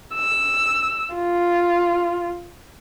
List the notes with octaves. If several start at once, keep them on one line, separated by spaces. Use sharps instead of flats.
E6
F4